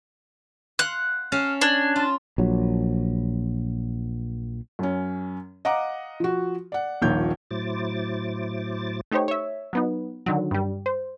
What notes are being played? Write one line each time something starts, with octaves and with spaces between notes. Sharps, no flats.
F5 F#5 C6 F#6
C#4 F5 A5 F6
D4 G#6
F4 A5
A#1 F#3
F#2 C#4
D#5 F5 F#5 A#5 D6
F3 F#4
D5 F#5
D#1 A#1 D#3 F4 C#5 G6
A2 F#3 E4 C5 D6 A6
A3 D#4 G4 C5 C#5
C#5 E5
F#3 B3 D#4
D3 D#3 F#3
G2 G3
C5